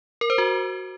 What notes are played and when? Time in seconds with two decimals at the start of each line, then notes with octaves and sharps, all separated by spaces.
0.21 A#4
0.30 C5
0.38 F#4